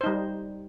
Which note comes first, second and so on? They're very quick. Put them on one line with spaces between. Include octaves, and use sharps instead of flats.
C5 D#4 G3